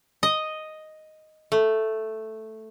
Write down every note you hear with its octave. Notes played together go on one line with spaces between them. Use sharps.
D#5
A3